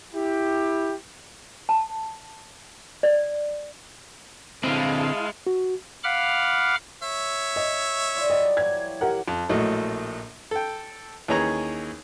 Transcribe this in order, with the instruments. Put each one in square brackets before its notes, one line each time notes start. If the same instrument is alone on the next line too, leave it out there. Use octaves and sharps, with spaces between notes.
[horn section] E4 G4
[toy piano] A5
D5
[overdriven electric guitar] D3 C4 [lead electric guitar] G#3 [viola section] E4 F5 A5
[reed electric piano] F#4
[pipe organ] F5 F#5 B5 D6 F6
[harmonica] C#5 E5
[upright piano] D#5
[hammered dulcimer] F4 D5 F#5
[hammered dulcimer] F#3 G3 [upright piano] D#5
[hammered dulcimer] E3 F#3 [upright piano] G#6
[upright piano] G4 A#4 F#5
[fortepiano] F2
A#1 A2 F#3 A3 D#5
A4 G5
D#2 E3 C#4 G#4 C#5 A#5